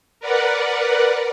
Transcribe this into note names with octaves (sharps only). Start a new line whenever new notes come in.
A#4 B4 D5 F#5